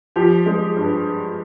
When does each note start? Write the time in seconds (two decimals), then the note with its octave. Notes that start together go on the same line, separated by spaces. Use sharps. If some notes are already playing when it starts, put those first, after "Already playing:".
0.16 F3 G4
0.46 G#3
0.77 G2